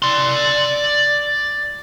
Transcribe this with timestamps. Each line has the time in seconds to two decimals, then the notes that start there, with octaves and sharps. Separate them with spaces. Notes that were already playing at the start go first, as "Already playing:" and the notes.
0.02 D5 C6